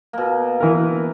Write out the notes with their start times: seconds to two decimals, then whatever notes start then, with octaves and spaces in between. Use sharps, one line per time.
0.13 B2 A#3
0.60 E3 A#4